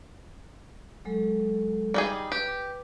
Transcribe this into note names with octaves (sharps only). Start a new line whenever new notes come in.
F#3 G#3 A4
G3 D#4 G#4
G4 B4